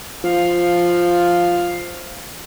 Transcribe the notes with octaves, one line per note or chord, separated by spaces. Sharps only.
F3 F5